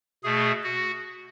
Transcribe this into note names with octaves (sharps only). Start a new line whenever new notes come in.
B2 A3 G#4
F#4